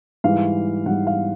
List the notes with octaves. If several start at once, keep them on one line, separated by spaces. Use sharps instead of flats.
G#2 E3 G3 F5
G#2 E3 G3 F#5
F5